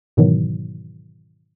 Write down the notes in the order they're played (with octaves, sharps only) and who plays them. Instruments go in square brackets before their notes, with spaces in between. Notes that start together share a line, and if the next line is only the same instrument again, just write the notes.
[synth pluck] G#2 B2 D#3 E3 F#3